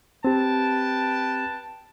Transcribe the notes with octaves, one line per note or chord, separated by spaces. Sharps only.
C4 G4 B4 G5 A5